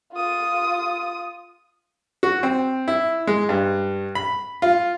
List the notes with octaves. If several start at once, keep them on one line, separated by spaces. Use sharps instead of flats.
F4 D#6
F#4
C4
E4
G#3
G2
B5
F4